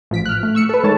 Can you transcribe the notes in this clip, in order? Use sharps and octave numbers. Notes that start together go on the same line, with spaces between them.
A1 F3 B6 D7
F6 F#6
A3
C#6 E6 C#7
A4 B4
D#3 G#3 C#5 A5